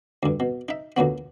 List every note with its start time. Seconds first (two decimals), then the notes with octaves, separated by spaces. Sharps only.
0.23 D2 G2
0.40 B2
0.69 D#4 E5
0.97 D2 A#2 F#3 B3